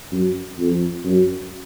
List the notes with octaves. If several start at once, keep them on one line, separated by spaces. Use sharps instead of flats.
F#2
F2
F#2